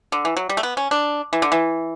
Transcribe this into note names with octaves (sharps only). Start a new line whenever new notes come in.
D3
E3
F#3
G3
A3
B3
C#4
D4
E3
D3
E3